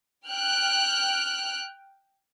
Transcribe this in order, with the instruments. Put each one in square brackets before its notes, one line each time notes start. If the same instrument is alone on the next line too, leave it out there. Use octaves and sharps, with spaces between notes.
[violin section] G5 F6 F#6